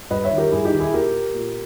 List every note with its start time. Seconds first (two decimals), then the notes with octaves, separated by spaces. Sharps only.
0.10 G2 B4 D#5
0.24 C#5 E5
0.31 D#3
0.38 G4 A#4
0.52 G2 E4 G#4
0.65 D#4 G4
0.72 D#3
0.80 E4 G#4
0.94 A#2 G4 A#4
1.34 A#2